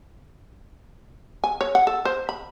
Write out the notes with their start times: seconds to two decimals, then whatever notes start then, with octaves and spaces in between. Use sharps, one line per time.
1.44 G#5
1.61 C#5
1.75 F#5
1.87 A4
2.05 C5
2.29 B5